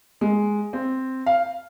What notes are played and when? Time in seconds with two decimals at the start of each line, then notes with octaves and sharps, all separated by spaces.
0.21 G#3
0.73 C4
1.26 F5